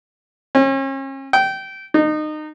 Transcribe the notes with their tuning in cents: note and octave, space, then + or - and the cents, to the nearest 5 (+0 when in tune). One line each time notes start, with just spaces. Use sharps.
C#4 -40
G5 -20
D#4 -25